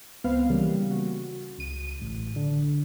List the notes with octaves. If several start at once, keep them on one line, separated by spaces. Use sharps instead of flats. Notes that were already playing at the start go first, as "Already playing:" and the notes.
C#2 B3 C4 F5
C#3 E3 G3 A#3
F#4
C#2 D#7
A1
D3